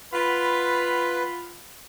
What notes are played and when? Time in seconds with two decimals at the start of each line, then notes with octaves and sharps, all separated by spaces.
0.13 F4 B4 F#5 B5